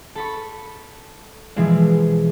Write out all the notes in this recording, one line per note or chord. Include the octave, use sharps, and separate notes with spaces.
A4 B5 C#6
B2 E3 F3 G#3 C4